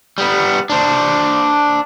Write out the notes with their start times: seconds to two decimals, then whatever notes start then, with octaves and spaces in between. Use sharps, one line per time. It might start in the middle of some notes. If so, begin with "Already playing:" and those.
0.18 G3 B3
0.70 D4 C5